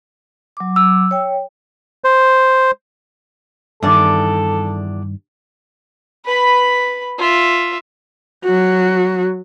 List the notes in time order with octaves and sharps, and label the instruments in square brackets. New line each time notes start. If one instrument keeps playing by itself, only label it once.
[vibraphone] F#3 D6
[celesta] E6
[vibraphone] C#5 G5
[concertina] C5
[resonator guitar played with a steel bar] E2 D4 D5 [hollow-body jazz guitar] G2 D#3 [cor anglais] A4
[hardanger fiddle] B4 B5
F4 E5
[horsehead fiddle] F#3 F#4